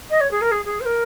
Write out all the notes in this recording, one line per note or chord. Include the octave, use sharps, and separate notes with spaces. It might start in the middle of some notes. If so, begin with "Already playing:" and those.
D#5
C#5
G#4
A#4
G#4
G#4
C5
A#4